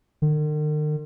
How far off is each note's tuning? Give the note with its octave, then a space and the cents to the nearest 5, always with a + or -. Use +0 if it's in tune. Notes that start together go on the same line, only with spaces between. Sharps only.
D#3 -45